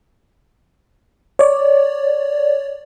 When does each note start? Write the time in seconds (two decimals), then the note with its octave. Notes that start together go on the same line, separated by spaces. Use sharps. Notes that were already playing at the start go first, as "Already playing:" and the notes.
1.39 C#5 D5